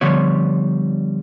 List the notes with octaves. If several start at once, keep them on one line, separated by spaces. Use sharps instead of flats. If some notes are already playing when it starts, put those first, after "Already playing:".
D3 F3 G3 B3 C#5